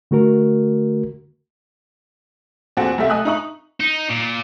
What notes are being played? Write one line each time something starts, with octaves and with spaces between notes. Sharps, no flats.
D3 A3 F#4 A#4
E2 A#2 C4 F#4 A4 F#5
F#1 B1 C3 A3 E5 F#5
A4 D#5 G#5 D#6 F#6
D#4 E5 A#5 C#6 D#6 F#7
D#4
A#2